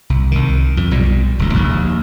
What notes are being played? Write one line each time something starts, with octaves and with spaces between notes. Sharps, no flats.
C2
C2 D#3
F2
B1 A#2 G3
D#1 C#2
A#1 D#2